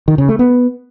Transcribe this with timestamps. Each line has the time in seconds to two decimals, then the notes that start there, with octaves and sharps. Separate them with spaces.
0.08 D#3
0.18 C#3
0.29 A3
0.39 B3